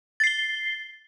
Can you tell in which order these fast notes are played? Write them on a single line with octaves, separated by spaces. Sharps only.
A6 C7 G7